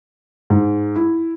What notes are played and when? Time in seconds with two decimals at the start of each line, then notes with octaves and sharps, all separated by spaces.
0.50 G#2
0.96 E4